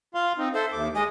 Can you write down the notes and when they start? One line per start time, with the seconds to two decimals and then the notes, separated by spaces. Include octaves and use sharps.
0.15 F4 F5 C6
0.38 C4 D#4
0.54 A4 C5 E5
0.72 D#2 D6
0.95 G#3 D#5 G#5